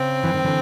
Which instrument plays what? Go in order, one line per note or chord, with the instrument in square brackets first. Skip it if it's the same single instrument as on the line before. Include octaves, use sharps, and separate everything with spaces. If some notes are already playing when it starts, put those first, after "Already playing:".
Already playing: [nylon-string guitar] C#3 [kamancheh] C4
[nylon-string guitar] E3
D#3
D3 E3